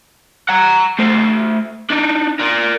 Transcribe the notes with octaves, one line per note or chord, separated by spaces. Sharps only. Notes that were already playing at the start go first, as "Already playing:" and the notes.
F#5 A#5
A3 C5
D4 D#4
A#4 D5